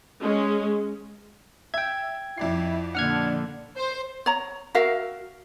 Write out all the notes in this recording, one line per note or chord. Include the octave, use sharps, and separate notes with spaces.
G#3 C#4
E5 G5 G#6
F2 E4 D5 C7
A#2 D3 D4 F#5 F6 G#6
C5
C#5 A#5
F#4 A#4 E5 F5